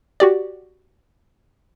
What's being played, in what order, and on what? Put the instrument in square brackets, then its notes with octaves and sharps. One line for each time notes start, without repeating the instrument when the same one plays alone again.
[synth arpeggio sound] F#4 G4 D5